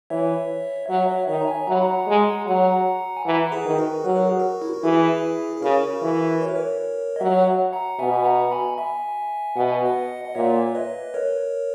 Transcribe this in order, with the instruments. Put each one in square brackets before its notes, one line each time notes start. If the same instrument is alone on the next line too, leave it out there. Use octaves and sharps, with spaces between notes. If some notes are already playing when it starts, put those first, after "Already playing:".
[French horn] E3 [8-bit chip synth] C#5 E5
[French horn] F#3 [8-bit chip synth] C#5 E5
[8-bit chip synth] C#5 E5
[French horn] D#3 [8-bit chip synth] C#5 E5
[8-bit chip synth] A#5
E5 G#5
[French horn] F#3 [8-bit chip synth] A#5
[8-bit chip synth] B5
F#5 A#5
[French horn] G#3
[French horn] F#3 [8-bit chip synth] F#5 A#5
[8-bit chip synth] G#5
[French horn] E3 [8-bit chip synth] F#5 A#5
[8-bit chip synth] G#4 B4
[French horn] D#3
[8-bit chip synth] F#4 A#4
[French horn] F#3 [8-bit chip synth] B4
[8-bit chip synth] A#4
G#4
F#4 A#4
E4
F#4
[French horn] E3 [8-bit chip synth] E4 G#4
[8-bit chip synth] G#4
[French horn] C#3 [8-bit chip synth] F#4 A#4
[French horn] E3
[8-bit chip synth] C#5
B4
A#4 C#5
D#5
[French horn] F#3 [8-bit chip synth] C#5 E5
[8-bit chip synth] F#5 A#5
[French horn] B2 [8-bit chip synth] E5 G#5
[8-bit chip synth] F#5 A#5
G#5 B5
E5 G#5
[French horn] B2 [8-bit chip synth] F#5
[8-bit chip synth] G#5
D#5 F#5
D#5
[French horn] A#2 [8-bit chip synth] C#5 E5
[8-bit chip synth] C#5
B4 D#5
A#4 C#5